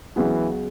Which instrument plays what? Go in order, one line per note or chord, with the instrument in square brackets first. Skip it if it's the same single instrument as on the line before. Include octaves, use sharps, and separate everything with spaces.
[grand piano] C#2 C#3 F#3 B3 [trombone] E3